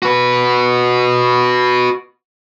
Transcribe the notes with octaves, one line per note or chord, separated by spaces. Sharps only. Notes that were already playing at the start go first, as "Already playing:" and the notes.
F#4 B4